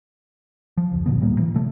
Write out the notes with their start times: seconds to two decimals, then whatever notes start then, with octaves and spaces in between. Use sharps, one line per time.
0.77 F3
0.92 F1 C#2
1.06 G1 A#2 D3 B3
1.21 D2 A2 G3 A#3
1.39 E3
1.54 C3 A3